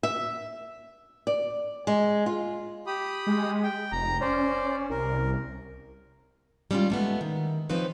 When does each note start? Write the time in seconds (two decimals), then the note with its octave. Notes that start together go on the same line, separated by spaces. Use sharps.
0.03 E5
1.27 D5
1.87 G#3
2.26 F4
2.87 G4 B5 D#6
3.27 G#3
3.63 G5
3.92 F1 A#5
4.21 C#4 C5 D5
4.90 C2 A#4
6.71 G3 G#3 C#4 D4 F4
6.90 G#3 A3 B3
7.21 D#3
7.69 C#3 F3 C4 D#4 B4 C#5